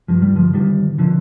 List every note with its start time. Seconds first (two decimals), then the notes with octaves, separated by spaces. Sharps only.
0.08 G2 F3
0.22 G3
0.36 D3 F3
0.53 D3 D#3 G3
0.98 D3 F3